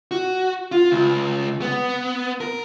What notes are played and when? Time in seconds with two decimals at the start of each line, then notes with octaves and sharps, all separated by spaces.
0.11 F#4
0.72 F4
0.92 C#2
1.62 B3
2.41 A#4